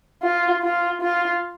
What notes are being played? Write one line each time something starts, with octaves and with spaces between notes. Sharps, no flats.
F4
F4
F4